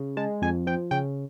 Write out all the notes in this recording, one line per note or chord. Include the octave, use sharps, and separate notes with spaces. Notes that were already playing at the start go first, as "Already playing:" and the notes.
Already playing: C#3
G#3 A5
F2 G#5
F3 G5
C#3 G5